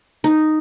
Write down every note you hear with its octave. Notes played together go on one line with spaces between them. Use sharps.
D#4